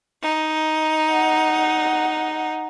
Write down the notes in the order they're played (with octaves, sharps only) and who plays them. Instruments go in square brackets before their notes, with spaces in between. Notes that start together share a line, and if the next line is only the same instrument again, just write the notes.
[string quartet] D#4
[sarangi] F#5